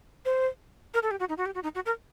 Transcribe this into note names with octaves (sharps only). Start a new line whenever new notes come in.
C5
A#4
A4
G4
F#4
D#4
F#4
G4
F#4
D#4
F#4
A#4